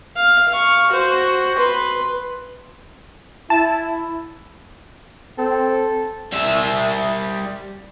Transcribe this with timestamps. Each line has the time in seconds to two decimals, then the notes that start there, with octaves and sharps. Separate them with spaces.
0.16 F5
0.48 F5 C#6
0.91 F#4 C5
1.58 B4 C6
3.50 E4 A5
5.38 C4 A4
6.32 G3 E5